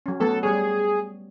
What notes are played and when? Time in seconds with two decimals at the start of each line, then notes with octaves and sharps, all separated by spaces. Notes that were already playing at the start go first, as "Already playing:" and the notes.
0.06 F#3 C#4
0.20 F#3 A3 B3 A4
0.43 G3 G#4 C#5